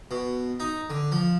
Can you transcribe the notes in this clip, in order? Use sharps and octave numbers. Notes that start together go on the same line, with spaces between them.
B2
D#4
D3
F3